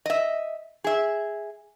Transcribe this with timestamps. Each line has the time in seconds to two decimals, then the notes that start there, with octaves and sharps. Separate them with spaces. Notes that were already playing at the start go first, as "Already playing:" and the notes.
0.06 D#5 E5
0.84 G#4 E5